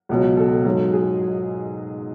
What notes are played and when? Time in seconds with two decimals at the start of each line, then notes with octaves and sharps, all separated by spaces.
0.09 C#2 B2 F#3
0.37 A4
0.65 G#2 F#3
0.93 G#4